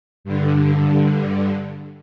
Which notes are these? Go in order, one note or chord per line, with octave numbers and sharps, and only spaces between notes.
G2 D3